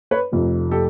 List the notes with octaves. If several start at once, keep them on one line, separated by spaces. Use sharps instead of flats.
B4 C#5
F1 F2 C3 F3 A3
G4 A4